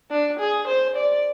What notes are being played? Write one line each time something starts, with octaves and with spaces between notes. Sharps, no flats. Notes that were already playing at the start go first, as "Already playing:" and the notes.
D4
G#4
C5
D5